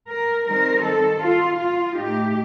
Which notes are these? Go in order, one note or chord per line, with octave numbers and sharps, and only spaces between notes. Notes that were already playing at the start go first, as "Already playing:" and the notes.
A#4
D#3 G3 C4 D#4 A#4
A4
F4
F4
A2 A3 D#4 G4